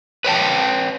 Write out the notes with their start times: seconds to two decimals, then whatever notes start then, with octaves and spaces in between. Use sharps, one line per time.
0.25 B4 C#5 G5 A5